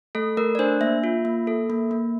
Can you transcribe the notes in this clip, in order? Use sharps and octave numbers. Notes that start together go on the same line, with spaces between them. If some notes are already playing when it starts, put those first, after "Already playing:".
A3 A4
A3 A#4
D5
D4 C5
A#3 E5
F4
A#3
A4
A#3
A#3